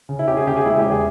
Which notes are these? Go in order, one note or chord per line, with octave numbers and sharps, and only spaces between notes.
C#3
E4
C#4 G4
G#4
C#3 G4
G#4
G#3 E4
G4
E2
G#4